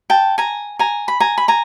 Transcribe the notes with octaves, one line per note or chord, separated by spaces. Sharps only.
G5 A5
G#5 A#5
G#5 A#5
B5
G#5 A#5
B5
G#5 A#5